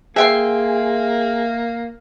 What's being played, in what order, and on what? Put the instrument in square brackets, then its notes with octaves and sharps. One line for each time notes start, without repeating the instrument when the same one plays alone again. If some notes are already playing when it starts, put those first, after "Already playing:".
[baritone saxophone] A#3 [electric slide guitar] G#4 [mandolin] E5 G5 C6